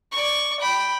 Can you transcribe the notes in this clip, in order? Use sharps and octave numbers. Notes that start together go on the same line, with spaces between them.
D5 C#6
G5 B5